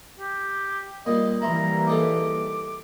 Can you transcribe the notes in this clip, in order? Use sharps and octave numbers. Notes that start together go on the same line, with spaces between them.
G4
A#2 G3 D#5
E3 G3 A#3 E4 A#5 C6
D#4 G#4 A4 D6